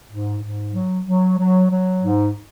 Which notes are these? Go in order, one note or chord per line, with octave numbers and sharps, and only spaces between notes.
G#2
G#2
F#3
F#3
F#3
F#3
G#2